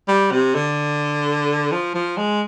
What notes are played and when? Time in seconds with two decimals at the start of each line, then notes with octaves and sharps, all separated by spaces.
0.08 G3
0.32 C3
0.55 D3
1.72 F3
1.95 F3
2.18 G#3